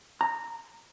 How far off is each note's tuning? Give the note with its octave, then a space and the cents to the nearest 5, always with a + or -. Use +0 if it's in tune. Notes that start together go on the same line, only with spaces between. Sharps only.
A#5 -15